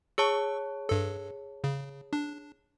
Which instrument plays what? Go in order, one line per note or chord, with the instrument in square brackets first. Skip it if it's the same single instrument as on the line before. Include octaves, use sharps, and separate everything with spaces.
[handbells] G#4 C#5 A5 [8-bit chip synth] C#6 E6
[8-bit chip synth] G2 A4
C#3
D4